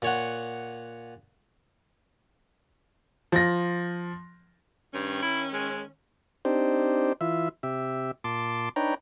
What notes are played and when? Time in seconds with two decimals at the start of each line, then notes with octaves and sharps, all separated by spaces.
0.02 A#2 C#5 F#5
3.32 F3 A#6
4.94 G2 D#3 C#4
5.22 E4
5.53 G#3
6.45 C4 D4 D#4 G4 C5
7.21 E3 F4 E5
7.63 C3 G4 E5
8.24 A#2 A5 C6 D6
8.76 D4 D#4 B4 C#5 G5 A#5